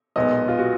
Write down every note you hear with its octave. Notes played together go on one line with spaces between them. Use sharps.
B1 A#2 G#3 B3 D#5
F4
F#4